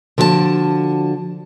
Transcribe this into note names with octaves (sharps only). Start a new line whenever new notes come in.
D3 F3 F#4 E5 A5